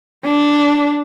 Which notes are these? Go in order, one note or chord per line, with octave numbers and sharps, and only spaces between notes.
D4